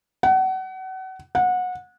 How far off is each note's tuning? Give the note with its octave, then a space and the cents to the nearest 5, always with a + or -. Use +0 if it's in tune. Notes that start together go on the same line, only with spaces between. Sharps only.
F#5 +30
F#5 -25